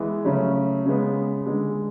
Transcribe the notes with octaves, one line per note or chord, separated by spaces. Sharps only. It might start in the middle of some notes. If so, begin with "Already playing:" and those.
Already playing: E3 G#3 B3
C#3 F#3 A3 C#4
C#3 G#3 B3
D3 G#3 D4